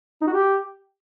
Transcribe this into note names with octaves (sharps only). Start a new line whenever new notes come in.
D#4
F#4
G4